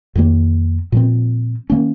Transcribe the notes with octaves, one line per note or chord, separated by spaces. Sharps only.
F2 D#3 A#3
A#2 F3 C4
D#3 A#3 C#4